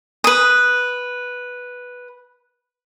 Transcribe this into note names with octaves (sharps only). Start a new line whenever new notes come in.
B4 D#6